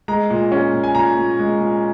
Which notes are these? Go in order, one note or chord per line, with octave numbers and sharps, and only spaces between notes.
G#3 A#5
A#2
C#4
A#2
G#5
A#2 A#5
A#2
G#3
A#2